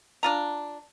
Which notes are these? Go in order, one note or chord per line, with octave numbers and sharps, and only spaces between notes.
D4 F4 A#5